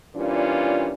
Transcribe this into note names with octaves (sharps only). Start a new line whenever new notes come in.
A#2 E3 G3 C#4 D4 F4